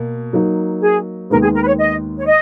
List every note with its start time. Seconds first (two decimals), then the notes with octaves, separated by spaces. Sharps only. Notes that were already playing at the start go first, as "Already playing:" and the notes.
Already playing: B2 A#3
0.33 F#3 A#3 D#4
0.81 G#4
1.30 D#2 D#3 G#3 B3 A#4
1.43 G#4
1.54 A#4
1.62 B4
1.67 C#5
1.79 D#5
2.19 C#5
2.26 D#5